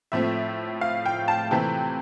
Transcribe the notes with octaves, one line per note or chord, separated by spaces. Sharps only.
A2 F3 A3 C4 E5
F5
G5
A5
C3 E3 A3 C4 G5